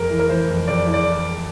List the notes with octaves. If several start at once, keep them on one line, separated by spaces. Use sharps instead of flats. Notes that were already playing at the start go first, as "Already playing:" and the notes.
Already playing: F2 A#4
E3
A#4
E3 C5
F2
F2 D5
E3
D5